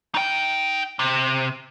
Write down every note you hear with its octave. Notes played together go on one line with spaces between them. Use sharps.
D#4 G5
C3